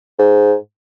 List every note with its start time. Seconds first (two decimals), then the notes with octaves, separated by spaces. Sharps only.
0.19 G#2